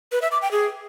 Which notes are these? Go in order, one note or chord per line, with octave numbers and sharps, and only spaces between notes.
B4
E5
D6
G5
G#4